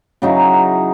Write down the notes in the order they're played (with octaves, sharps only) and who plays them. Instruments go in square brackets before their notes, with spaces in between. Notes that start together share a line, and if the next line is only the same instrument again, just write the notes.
[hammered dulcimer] C#3 F#3 D#4 E4